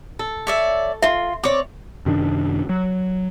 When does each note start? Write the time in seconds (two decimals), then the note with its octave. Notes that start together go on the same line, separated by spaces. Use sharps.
0.19 A4
0.47 C#5 D5 E5
1.02 F4 E5 C6
1.44 C4 C#5 D5 D6
2.06 F#2 C3 D#3 D4
2.69 F#3